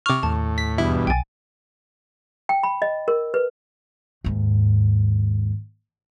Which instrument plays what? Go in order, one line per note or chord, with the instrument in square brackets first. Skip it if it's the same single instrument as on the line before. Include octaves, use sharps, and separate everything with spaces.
[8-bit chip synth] C3 F6 [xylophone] C#6 D6
[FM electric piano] D#2 [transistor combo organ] A2 [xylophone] A5
[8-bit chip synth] B6
[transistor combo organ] E2 G2 B2 [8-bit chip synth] E4
[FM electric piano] B1 A6 [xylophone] G5 G#5
[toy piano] G5
B5
D#5
A#4
B4
[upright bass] D#2 G#2